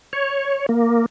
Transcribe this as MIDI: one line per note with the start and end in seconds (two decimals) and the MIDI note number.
0.13 0.66 73
0.69 1.06 58